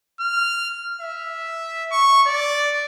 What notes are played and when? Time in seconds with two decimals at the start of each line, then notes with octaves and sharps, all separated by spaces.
0.20 F6
1.02 E5
1.92 C#6
2.26 D5